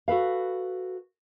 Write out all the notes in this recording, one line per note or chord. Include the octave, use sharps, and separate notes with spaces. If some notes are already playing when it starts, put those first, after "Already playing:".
F#4 A4 B4 F5